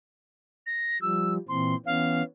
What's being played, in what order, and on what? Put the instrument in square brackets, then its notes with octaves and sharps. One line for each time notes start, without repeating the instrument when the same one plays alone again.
[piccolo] A#6
[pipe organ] F3 G3 [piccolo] E6
[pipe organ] A#2 E3 C4 [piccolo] C6
[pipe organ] E3 B3 C#4 [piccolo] F5